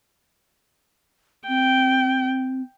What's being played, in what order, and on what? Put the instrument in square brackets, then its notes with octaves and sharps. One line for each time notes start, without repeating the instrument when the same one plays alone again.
[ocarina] C4 [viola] G5